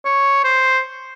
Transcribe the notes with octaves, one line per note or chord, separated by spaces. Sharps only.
C#5
C5